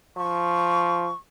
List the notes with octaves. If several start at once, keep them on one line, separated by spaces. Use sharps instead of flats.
F3 C#6